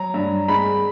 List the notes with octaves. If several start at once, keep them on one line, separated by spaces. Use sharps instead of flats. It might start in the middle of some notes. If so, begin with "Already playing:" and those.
Already playing: F#3 A#5
G2
G#3 B5